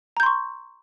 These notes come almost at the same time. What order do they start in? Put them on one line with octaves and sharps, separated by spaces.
A#5 G6 C6 C#6